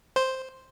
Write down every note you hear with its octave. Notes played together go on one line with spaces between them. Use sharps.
C5